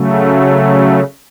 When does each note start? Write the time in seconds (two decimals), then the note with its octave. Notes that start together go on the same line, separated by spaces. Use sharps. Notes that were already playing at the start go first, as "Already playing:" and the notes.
Already playing: C#3 F#3 A3